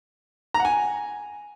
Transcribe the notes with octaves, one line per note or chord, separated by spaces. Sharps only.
A#5
F#5
G#5